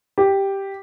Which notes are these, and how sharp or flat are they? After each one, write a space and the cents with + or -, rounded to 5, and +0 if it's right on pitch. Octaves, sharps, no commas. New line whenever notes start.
G4 +0